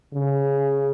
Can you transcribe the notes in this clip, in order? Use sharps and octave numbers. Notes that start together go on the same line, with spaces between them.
C#3